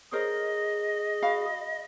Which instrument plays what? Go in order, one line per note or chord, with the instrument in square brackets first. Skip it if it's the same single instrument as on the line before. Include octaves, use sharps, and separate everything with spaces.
[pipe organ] G#4 [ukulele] A#4 C5 C#5 [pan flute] D#5
[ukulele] F#4 F5 B5